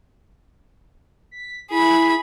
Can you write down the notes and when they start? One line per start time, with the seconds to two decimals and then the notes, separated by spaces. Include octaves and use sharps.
1.31 B6
1.71 E4 G#4 B5